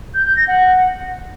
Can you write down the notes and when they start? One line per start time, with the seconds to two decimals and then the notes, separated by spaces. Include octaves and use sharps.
0.14 G6
0.25 G6
0.36 A#6
0.48 F#5